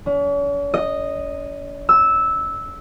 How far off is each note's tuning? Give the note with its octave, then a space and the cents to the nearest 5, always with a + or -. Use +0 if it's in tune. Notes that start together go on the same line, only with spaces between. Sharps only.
C#4 +45
D#5 -5
E6 -10